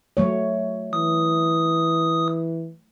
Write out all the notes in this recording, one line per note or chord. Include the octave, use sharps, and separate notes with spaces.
F#3 A3 C#5
E3 D#6